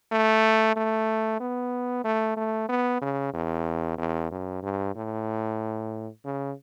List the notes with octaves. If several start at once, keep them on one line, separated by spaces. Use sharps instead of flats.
A3
A3
B3
A3
A3
B3
C#3
E2
E2
F#2
G2
A2
C#3